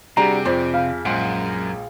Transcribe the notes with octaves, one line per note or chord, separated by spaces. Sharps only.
C3 G3 D4 F#4 G#4 A#5
F2 C5 D5
F5 B5
A#1 F#2 G#3 F#5 C6